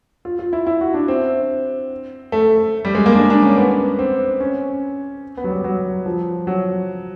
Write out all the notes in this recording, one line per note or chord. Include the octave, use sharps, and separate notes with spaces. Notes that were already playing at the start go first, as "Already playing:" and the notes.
F4
F4
E4
E4
F#4
D4
C4
A3
G3
G#3
A#3
D4
D4
C#4
B3
C4
C#4
B3
F#3
G3
F#3
F3
F#3